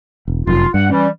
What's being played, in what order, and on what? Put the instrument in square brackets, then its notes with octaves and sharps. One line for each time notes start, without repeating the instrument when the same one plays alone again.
[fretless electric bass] E1
[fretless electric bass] F1 F#2 [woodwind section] F4
[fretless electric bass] G2 [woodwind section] F#5
[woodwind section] E3 G3 [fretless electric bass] C#4